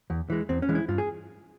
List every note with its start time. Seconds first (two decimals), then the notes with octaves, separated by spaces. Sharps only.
0.10 E2
0.30 E3 G#3
0.49 E2 C4
0.62 C#4
0.69 E3 G#3
0.75 E4
0.88 G2 F4
0.98 G#4